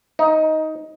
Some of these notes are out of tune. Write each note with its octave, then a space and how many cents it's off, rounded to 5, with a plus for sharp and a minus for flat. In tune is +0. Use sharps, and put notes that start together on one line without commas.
D#4 +15